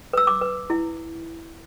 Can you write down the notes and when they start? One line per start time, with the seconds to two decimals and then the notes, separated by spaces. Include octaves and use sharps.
0.13 B4 E6
0.27 D6
0.41 B4
0.70 E4